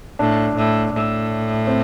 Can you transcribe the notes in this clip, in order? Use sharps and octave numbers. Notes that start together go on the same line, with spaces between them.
A2 D4
A2
A2
C4